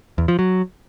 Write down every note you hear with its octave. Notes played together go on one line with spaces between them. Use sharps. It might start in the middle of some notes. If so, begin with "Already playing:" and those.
E2
F3
F#3